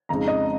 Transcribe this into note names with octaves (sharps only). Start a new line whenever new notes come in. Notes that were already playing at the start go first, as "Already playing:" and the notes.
F2 C#3 G#3 D#4 A#5
D#5